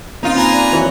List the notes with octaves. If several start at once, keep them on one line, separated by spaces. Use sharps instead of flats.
A#3 C4 C#4 D#4 F4
B4 G#5 A#5
D5
E3 F#3 C#5